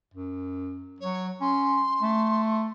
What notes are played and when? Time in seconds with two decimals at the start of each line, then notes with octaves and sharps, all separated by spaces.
0.14 F#2
1.00 F#3 C#5
1.41 C#4 C6
2.02 A3